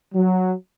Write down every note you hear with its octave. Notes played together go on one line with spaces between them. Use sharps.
F#3